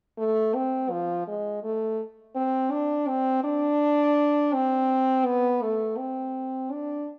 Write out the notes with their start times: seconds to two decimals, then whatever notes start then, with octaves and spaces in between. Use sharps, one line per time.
0.18 A3
0.55 C4
0.90 F3
1.27 G#3
1.63 A3
2.35 C4
2.71 D4
3.08 C4
3.44 D4
4.53 C4
5.26 B3
5.62 A3
5.98 C4
6.71 D4